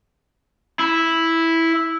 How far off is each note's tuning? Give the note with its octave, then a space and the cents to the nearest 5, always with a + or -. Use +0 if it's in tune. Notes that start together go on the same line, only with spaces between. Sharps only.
E4 -5